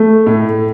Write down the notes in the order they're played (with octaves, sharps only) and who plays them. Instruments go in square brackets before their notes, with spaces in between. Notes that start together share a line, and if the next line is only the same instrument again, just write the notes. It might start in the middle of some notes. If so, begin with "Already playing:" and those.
Already playing: [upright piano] A3
A2